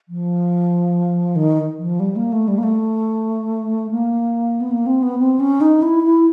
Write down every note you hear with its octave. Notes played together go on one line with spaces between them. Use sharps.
F3
D#3
F3
G3
A#3
A3
G3
A#3
A3
A#3
B3
A#3
C4
B3
C4
C#4
D#4
E4
E4